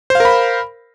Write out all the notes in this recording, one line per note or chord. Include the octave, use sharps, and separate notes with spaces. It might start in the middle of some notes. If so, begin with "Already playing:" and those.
A#4 C5 F5 B5